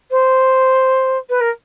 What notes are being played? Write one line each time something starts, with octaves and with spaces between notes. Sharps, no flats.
C5
B4
A#4